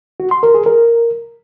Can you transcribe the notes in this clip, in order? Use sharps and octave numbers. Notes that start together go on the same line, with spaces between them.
F#4
C6
A#4
G#4
A#4